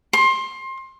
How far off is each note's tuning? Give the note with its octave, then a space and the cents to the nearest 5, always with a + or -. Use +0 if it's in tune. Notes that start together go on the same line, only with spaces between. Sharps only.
C6 +25